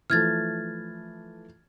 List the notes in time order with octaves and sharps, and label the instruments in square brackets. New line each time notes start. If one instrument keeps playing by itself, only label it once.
[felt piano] E3 F3 A3 [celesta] F6 G#6 A6